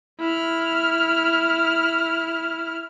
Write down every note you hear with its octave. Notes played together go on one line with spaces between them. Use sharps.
E4 F6